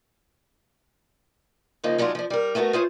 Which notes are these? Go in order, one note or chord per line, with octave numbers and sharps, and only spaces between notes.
C#3 F3 A#3 D#4
F#3 G#3 D4 D#4 F4
F3 D4
G3 A#4
A3 B3 E4 F#4 A#4
F4 G#4 C5 C#5